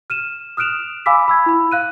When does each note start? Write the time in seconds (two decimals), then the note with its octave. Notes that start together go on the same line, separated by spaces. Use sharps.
0.10 F6 D#7 E7
0.57 D#6 F6 F#6 D7 E7 F7
1.06 F5 G#5 B5 D6 E6 B6
1.28 B5 E6 G#6
1.46 E4 B5
1.72 F5 F#6 D#7